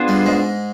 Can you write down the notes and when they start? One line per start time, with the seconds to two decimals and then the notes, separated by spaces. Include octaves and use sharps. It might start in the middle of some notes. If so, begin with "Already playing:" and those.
Already playing: B3 D4 F4 G#4 C5
0.08 G2 G3
0.26 G#2 G#3